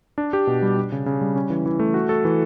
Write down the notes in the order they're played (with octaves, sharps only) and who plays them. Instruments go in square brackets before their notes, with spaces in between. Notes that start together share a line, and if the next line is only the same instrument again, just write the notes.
[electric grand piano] D4
G4
B2
G3
D4
C#3
C#3
G3
C#4
E3
E3
A3
F#4
A4
E3